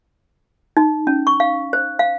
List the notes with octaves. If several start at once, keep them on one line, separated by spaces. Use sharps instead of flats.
D#4
C#4
C#6
F5
C5
F5